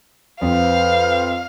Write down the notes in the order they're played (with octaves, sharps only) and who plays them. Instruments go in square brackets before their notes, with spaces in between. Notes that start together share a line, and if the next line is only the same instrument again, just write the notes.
[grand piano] F2 [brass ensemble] B4 C5 [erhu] F5